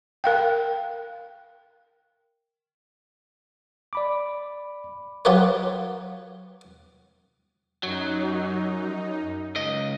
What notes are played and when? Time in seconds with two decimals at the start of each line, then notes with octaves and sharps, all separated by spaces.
0.24 A#4 F5 G5
3.93 D5 B5 D6
5.25 F#3 F4 G4 A#4 B4 C#5
7.83 F#2 F#3 D#4
9.56 C#2 D#5